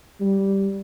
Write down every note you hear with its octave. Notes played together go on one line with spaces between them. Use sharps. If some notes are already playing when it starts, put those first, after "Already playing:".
G3